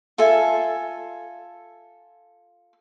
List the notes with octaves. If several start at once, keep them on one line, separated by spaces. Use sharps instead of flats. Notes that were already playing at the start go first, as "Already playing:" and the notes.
F4 A4 E5 G#5